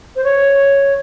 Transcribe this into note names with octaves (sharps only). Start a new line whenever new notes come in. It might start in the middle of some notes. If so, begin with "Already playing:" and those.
C5
C#5